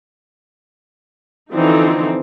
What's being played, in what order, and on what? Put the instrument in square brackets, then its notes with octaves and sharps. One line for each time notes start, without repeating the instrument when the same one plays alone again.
[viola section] D3 E3 F3 C4 D#4